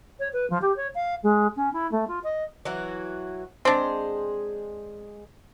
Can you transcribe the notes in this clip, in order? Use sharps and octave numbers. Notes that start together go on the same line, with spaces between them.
C#5
B4
F3
G4
C#5
F5
G#3
C#4
E4
A3
F4
D#5
E3 F#3 F#4
G#3 C4 D4 G#4 C5